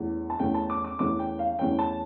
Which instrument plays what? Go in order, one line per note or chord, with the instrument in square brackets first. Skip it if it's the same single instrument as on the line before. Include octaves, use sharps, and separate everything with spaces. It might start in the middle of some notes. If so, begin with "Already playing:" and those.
Already playing: [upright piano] E2 E3 A3 C#4
A5
E2 E3 A3 C#4 G5
A5
D6
D6
E2 E3 A3 C#4 D6
G5
F5
E2 E3 A3 C#4 G5
A5